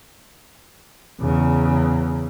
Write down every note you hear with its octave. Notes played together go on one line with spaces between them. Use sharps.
E2 C#3